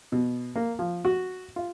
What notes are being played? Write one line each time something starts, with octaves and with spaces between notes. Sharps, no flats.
B2
A#3
F3
F#4
F4